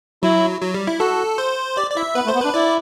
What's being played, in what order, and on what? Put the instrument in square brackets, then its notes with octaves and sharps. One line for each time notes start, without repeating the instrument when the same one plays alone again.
[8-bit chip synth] F#3 [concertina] E4
[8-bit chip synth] F#3
G3
E4
[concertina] F#4 [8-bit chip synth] A4
[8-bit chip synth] C5
[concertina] G4 [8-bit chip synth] D5
[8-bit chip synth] D5
[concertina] E4 [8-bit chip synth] E5
[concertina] B3 [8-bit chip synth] B4
[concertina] A3
[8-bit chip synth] C5
[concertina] B3
[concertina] D4 [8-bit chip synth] B4
[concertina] E4 [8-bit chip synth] D5